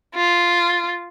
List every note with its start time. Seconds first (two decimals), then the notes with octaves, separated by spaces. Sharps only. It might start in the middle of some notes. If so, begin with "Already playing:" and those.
0.15 F4